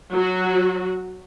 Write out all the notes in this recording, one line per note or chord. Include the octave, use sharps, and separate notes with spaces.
F#3 F#4